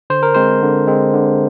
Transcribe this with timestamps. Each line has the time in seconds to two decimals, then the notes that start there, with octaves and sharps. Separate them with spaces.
0.10 D3 C5
0.23 A#4
0.34 G#3 C4 C5
0.62 D3
0.87 G#3 C4
1.13 D3